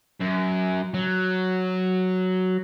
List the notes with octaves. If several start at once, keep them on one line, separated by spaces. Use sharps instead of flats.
F#2
F#3